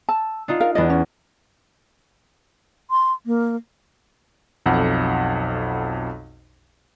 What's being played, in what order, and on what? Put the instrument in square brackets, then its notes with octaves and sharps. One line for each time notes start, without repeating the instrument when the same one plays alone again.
[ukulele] A5 [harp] E6
[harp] D4 D#4 F4
[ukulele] A#4 F5
[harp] E2 D4 D5 [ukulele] D#5
[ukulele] C#4
[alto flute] C6
A#3
[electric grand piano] B1 F2 A4 F#5